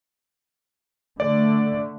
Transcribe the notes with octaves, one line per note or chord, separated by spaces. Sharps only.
D3 A3 D5